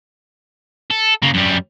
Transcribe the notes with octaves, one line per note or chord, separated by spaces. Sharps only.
A4
C#3 A#3
F#2 G3